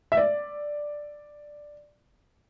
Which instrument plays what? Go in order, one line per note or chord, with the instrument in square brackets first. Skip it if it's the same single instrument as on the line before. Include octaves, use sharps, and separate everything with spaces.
[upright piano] E5
D5